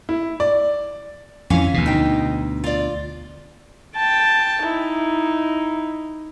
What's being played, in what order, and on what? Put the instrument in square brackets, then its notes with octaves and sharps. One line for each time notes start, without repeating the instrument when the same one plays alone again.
[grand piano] E4
D5
[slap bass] F2 E3 [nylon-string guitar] C#4 F5
[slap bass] D2 B2
[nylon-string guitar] D#4 G5
F4 D5
[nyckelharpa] G5 A5
D#4 E4